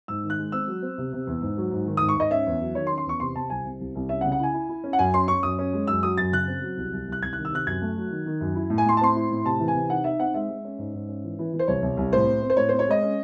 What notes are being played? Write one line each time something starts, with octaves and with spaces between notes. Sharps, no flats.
G#2 E6
D#3
F#6
G#3
C4 E6
F#3
C4
C3
C3
E2
G#2
F#3
G#2
D#3
G#2 D#6
C#6
G#2 D#5
C#4 E5
E2
F#3
D#3 C#5
C6
C#4
C6
E2 C#6
C3 C6
C3 A5
C2 G#5
C3
C2
C2
C#4 E5
F#5
C#3
F#5
E4 G#5
E4
E4
C#4
F#5
F#2 G#5
C#4 C6
C#4 C#6
F#2 D#6
C#4
G#3
F#2 E6
F#3 D#6
F#2 A6
C#3 F#6
C4
F#3
C2
C2
C2 F#6
C2 G#6
D#3 F#6
E6
C3 F#6
F#2 G#6
A3
F#3
D#3
D#3
F#2
E4
A2
G#5
A2 C6
A5
C4 C6
E4
A2
C3 A5
E3
G#5
C3
D#4 F#5
D#4 E5
C4 F#5
G#3 E5
G#3
C#4
G#2
G#2
C#4
E3
E3
E3
C5
C2 C#5
C2
C2
A2 C5
C4
C4
C5
A2 C#5
C4 C5
C#5
G#3 D#5
C#4